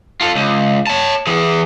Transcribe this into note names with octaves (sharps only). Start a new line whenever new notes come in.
F4 A4
C#2
C#5 A5
E3 G#4